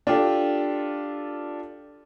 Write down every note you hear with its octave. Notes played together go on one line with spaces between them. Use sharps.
D4 F4 G4 A4